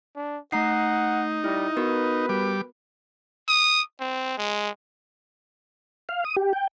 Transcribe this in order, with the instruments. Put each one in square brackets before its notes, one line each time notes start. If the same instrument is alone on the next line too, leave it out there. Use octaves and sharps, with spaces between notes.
[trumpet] D4
[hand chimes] A3 A#5 C7 [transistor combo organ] D#4 [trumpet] F#5
[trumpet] G3 [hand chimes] E4
[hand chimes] B3 F#4 A#4 [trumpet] B4
[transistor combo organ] G3 D6
[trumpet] D#6
C4
G#3
[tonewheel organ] F5
D#6
G4
G5